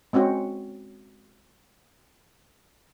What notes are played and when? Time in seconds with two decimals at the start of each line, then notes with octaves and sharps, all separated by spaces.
0.13 G#3 C4 C#4 F#4